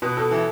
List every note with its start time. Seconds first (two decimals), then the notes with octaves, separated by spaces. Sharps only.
0.02 B2 B4
0.17 B2 A4
0.31 E3